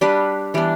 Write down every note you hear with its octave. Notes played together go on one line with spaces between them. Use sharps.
G3 D4 G4 B4
E3 G3 B3 D4